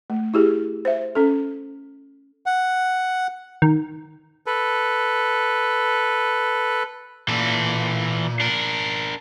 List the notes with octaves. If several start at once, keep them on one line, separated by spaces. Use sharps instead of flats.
A3
E4 G4 G#4
C5 E5
C#4 A4
F#5
D#3
A4 B4
A#2 E3 A4
D4 A#4